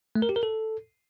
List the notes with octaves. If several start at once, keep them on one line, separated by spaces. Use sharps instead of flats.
A3
A#4
G4
A#4
A4